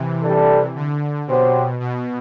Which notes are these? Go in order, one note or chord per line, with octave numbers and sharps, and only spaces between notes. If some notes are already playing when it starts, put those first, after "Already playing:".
Already playing: C3 E3
G3 D4 A4
D3
B2 F#3 C4 G4 C5
B2